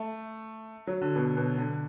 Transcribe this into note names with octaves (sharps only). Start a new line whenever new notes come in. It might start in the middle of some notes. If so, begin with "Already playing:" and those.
Already playing: A3
F#3
D3
B2
B2
D3